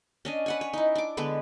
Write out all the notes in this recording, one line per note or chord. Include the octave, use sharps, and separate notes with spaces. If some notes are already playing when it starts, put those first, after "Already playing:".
C#4 D4 D#5
B4 F#5 G#5
C#5
D#4 E4
D4 D6
D3 G#3 B3 B4